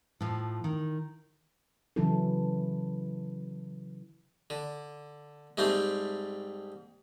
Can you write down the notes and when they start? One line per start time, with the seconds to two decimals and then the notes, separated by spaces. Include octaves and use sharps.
0.21 A2 F3
0.64 D#3
1.96 C#3 E3 F#3 C#4 E4 A4
4.50 D3
5.58 G#2 G3 A3 C4